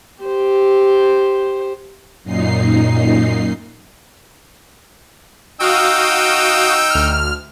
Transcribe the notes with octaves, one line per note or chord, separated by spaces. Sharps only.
G4 C5
F#2 A#2 D#4 C7
D#4 F#4 F5 G5 D#6 E6
D2 F6